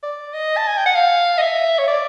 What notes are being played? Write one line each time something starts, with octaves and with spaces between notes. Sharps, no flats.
D5
D#5
A5
G#5
G5
F#5
F5
D#5
E5
C#5
D5